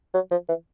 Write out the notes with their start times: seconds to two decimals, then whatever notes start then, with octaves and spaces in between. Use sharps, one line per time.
0.14 F#3
0.31 F3
0.48 E3